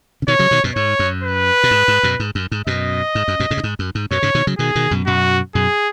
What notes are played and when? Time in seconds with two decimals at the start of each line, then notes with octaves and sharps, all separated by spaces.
0.22 C#3
0.28 B2 D#3 C#5
0.39 C#3 F#3
0.51 B2 D#3
0.64 F#2 B2
0.75 G#2 C#5
0.99 F#2
1.23 B4
1.63 B2
1.71 G#2
1.88 G#2
2.03 F#2 B2
2.20 G#2
2.35 F#2
2.51 G#2
2.67 F#2 B2 D#5
3.15 G#2
3.28 F#2
3.40 F#2 B2
3.51 G#2 C#3
3.57 F#2
3.64 G#2
3.79 F#2
3.95 G#2
4.11 F#2 B2 C#5
4.22 G#2 C#3
4.35 B2 D#3
4.47 C#3 F#3
4.58 B2 D#3 G#4
4.75 B2 D#3
4.91 F#2 B2
5.06 F#2 B2 F#4
5.55 F#2 B2 G#4